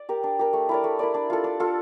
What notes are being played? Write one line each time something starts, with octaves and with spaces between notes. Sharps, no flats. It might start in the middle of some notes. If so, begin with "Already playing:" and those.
Already playing: D5
G4 A#4
D4
G4 A#4
A3
E4 A#4 D5
A3
E4 A#4 D5
D4
F4 A4
D4
F4 A4